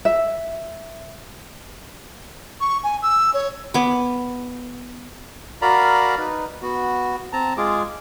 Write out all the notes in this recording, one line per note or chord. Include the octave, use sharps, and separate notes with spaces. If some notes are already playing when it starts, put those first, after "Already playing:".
E5
C#6
G#5
E6
C#5
B3 D6
F#4 A#4 D5 F5 A#5 B5
D#4 B4
B3 F#4
C4 A5 A#5
G#3 F4 G#4 D6